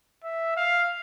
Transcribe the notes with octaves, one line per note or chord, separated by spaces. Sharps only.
E5
F5